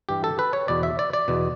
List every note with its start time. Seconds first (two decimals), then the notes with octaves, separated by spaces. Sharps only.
0.09 G2 E3 G4
0.24 A4
0.39 B4
0.53 C#5
0.68 E2 B2 D5
0.83 E5
0.99 D5
1.13 D5
1.28 E2 B2